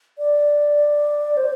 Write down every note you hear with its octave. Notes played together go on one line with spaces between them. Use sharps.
D5
C5